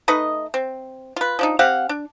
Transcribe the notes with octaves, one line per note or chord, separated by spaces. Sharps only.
A3 D#4 B4 D#5
C4
F4 B4
F3 D4 D#4
C4 G4 F5 F#5
D4